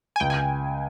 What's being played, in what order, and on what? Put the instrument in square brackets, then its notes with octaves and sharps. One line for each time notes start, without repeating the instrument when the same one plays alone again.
[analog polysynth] G#5
[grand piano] C#2 [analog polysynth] G5
[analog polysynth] G#5